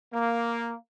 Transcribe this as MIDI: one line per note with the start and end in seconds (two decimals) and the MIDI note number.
0.13 0.75 58